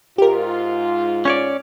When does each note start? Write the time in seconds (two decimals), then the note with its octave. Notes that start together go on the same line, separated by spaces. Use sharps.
0.18 G#2 F4 G4 A#4
1.25 C#4 C#5 D5